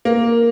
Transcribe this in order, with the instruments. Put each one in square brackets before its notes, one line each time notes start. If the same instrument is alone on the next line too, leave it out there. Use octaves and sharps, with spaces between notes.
[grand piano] A#3